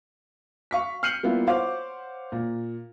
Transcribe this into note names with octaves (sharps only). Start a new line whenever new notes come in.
F5 C#6 B6
F6 G6 C7 C#7 D#7 F#7
G3 A#3 B3 E4 F4 G4
C5 C#5 F5 F#5 D6
A#2